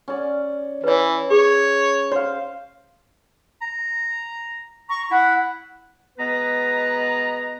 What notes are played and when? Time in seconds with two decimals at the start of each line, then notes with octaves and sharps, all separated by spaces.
0.08 C#4 D5
0.84 E3 B4 C#5
1.30 G#4 C#5
2.12 C5 C#5 F5
3.61 A#5
4.89 A#5 C#6
5.11 E4 F#5
6.18 B2 G#3 B3 B4 A#5